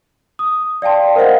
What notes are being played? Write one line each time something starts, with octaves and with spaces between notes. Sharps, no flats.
D#6
D5 F5 G5 A5 C6
A#4 C5 D#5 F5 F#5